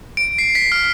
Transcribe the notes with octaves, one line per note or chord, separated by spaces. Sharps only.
D7
C7
B6
F6